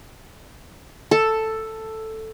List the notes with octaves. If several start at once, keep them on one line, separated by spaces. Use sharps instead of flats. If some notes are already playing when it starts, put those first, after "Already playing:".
A4